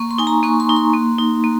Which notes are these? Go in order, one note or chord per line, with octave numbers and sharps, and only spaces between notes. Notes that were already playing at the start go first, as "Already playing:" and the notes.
Already playing: A#3 C#6
C6
D#4 G#5
A#5
A#3 C#6
C6
D#4
C6
A#3
D#4
A#3